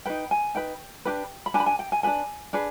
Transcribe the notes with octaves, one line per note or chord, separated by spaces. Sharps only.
D#4 B4 G5
G#5
D#4 B4 G5
D4 G4 B4
B5
D4 G4 B4 G#5
B5
G#5
G5
G#5
D4 G#4 B4 G#5
D4 G#4 B4